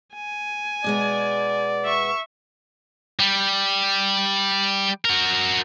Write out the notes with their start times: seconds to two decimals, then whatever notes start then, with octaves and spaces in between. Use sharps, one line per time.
0.14 G#5
0.84 B2 G#3 B3 D5
1.84 E5 C#6
3.20 G3
5.05 F#4 A#4